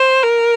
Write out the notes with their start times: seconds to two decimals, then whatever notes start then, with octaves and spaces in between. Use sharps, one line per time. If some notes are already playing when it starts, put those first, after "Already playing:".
Already playing: C5
0.23 A#4